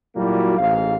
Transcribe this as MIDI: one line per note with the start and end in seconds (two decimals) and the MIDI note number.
0.15 0.58 46
0.15 0.58 54
0.15 0.58 55
0.15 0.58 58
0.15 0.58 64
0.15 0.58 66
0.59 0.96 33
0.59 0.96 44
0.59 0.96 77